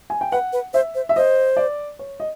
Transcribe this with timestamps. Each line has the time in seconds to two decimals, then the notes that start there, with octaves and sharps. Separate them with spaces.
0.10 G#5
0.21 G5
0.32 B4 F#5
0.53 B4
0.74 C5 E5
0.95 C5
1.09 E5
1.16 C5 D#5
1.57 D5
1.99 C#5
2.20 D#5